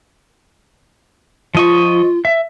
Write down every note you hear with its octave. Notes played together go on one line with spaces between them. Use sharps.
F3 F4 D#5 C#6
E5